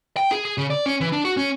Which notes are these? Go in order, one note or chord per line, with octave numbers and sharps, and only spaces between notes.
G5
G#4
G#4
C#3
D5
C#4
E3
D4
F#4
C#4